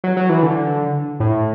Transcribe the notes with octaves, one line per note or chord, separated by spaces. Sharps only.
F#3
F#3
E3
D3
A2